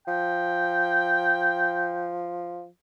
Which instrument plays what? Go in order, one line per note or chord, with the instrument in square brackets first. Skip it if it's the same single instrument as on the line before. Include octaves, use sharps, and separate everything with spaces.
[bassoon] F3 [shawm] G5